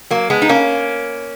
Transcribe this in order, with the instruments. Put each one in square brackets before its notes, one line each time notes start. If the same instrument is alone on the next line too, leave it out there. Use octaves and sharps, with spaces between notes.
[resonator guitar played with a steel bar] F#3 A#3
G#3 B3
D#4
A#3 C#4